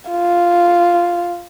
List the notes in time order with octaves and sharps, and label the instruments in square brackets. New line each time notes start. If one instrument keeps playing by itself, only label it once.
[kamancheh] F4